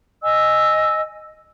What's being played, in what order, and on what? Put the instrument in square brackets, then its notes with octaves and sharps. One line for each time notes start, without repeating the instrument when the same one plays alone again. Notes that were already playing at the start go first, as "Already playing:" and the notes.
[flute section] D#5 G#5 E6